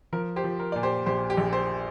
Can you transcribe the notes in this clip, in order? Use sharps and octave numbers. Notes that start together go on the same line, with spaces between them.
F3 A#4
G4 C5
F3
A#4
A#2 D5
G4 C5
A#1 G4 C5
G4
A#1
G4 C5